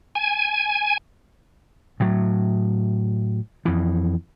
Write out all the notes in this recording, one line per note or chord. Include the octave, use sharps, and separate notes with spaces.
G#5
A2 F#3
F2 E3